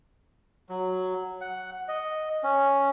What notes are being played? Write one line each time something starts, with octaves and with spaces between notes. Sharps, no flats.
F#3
F#5
D#5
C#4